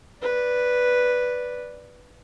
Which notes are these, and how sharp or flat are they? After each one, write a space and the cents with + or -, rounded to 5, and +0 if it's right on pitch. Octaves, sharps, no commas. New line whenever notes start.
B4 +0 D5 +0